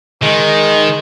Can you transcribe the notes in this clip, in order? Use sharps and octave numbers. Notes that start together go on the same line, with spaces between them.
D#3 G#3